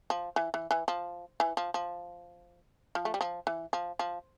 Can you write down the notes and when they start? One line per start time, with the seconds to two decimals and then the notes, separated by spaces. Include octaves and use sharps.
0.10 F3
0.36 E3
0.54 E3
0.71 E3
0.88 F3
1.40 E3
1.57 F3
1.74 F3
2.95 F3
3.05 A3
3.14 G3
3.21 F3
3.47 E3
3.73 F3
3.99 F3